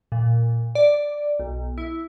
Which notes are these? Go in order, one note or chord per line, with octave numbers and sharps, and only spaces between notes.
A#2
D5
B1
E4